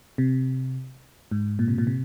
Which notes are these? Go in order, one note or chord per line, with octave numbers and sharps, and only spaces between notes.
C3
G#2
A#2
C3
A#2
C3